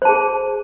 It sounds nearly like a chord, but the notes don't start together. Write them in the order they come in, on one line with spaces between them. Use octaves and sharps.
C5 A5 G#4